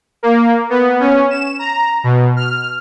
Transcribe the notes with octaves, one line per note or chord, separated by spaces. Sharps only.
A#3
B3
C#4
E7
A#5
B2
F6